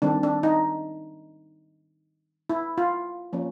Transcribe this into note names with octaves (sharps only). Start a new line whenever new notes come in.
D#3 G3 C4 D4
D4
D#4
E4
F4
F3 A#3 C#4